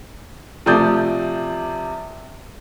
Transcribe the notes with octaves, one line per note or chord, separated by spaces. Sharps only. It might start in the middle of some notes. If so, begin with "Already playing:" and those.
C3 F3 A3 D5 D#6 G6